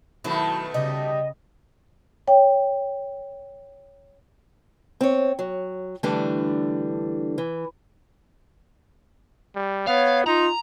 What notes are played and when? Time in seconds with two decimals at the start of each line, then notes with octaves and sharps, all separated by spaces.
0.24 B2 D#3 F#3 A3 E4
0.74 C#3 G3 D#5
2.28 C#5 G5
5.01 C4 C#5
5.39 F#3
6.03 D3 E3 G3 A3 D4
7.38 E3
9.55 G3
9.87 B3 C#5 F5
10.26 D#4 F4 A#5